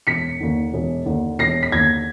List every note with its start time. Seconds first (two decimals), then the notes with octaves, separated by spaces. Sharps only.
0.07 E1 B6 C#7
0.40 D#2 D3
0.74 E1
1.06 D#2 D3
1.39 E1 A#6 C7
1.63 B6
1.72 D#2 D3 G#6 A#6